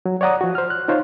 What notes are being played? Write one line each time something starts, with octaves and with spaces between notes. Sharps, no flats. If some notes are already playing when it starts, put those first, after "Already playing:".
F#3
C#5 D5 F#5 A#5 D#6
F3 F#4
C5 F6
F#6
D#4 F4 C5 C#5